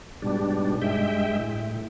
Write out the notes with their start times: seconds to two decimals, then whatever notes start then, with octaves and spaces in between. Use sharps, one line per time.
0.22 G#2 B2 G3 D4
0.82 G2 G#3 E5 G5
1.39 A2